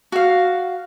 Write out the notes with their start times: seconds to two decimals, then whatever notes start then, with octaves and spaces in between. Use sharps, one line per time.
0.12 F#4 F5